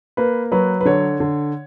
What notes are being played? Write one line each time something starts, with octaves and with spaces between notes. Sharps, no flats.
A#3 B4
F#3 B4
B4
D3 C#5
D3